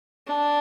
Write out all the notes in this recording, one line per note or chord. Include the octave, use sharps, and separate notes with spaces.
D4